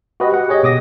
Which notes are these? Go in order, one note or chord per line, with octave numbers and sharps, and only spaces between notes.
F#4 G4 B4 D#5
F#5
G4 G#4 C#5 D#5
B2 D6 D#6 A#6